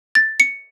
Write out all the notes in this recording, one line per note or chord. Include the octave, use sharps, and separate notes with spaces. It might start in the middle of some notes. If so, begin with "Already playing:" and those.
A6
C#7